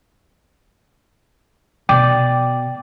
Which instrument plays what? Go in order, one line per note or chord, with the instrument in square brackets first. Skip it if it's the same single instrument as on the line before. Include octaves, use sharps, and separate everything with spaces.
[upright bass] B2 [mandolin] D5 [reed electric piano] G5